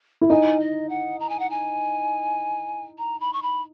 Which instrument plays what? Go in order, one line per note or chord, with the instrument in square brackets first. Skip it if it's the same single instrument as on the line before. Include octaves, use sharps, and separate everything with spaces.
[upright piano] E4
[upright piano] D#4 [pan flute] G#5
[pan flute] D#5
F#5
A#5
G#5
F#5
G#5
A#5
B5
C#6
B5